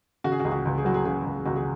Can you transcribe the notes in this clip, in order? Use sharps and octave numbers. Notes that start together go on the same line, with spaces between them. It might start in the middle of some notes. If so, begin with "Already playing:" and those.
C#3 F#4
G#4
F#4
C#2 G#4
F#4
C#2
G#4
F#3 F#4
G#4
C#3 G#4
C#2
C#2 F#4
G#4